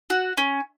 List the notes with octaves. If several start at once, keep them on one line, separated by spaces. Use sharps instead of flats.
F#4
C#4